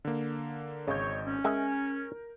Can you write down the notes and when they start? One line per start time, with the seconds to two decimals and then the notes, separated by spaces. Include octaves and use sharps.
0.05 D3 A#3
0.88 G#1 C#3 C#5 D#5 G6
1.26 C#4
1.44 G#3 A#4 E5 G#5